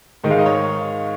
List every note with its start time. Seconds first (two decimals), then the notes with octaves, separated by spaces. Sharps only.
0.24 G#2 D#3 G#3 D#4
0.31 F5
0.39 D#5
0.46 C#5